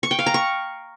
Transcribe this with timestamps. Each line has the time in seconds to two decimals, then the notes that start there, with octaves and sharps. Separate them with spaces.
0.03 C#6
0.11 G5
0.19 F5
0.26 A#5
0.34 C#6